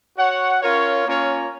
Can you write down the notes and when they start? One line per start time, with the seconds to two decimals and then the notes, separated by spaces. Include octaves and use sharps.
0.17 F#4 C#5 F#5
0.62 C#4 F4 A#4 C#5
1.06 A#3 C#4 F4 A#4 C#5